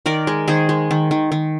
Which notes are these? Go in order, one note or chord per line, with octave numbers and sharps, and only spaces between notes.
D#3 A#4 D5
G#3
D#3 G#4 C5
G#3
D#3
D#3
D#3